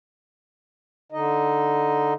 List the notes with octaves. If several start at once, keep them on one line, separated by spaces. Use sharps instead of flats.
D3 D#4 D#5